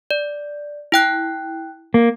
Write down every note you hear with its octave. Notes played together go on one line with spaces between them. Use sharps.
D5
E4 G5 F#6
A#3